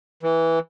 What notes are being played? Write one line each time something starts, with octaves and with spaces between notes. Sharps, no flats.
E3